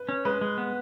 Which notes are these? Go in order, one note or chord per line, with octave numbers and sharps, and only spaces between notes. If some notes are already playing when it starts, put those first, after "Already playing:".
Already playing: B4
C#4
G#3 B4
G#3
B3